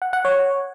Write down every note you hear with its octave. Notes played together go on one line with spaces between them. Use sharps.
F#5
F#5
C#5